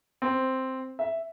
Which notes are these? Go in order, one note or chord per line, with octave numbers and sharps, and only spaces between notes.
C4
E5